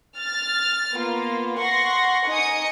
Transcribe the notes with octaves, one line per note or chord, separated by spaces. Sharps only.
F6 A6
A#3 B3 F4
F#5 C6 C#6 A#6
D#4 D#5 G#5 D#6 C#7